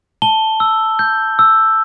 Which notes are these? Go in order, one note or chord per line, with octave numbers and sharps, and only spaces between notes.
A5 G7
E6
G6
E6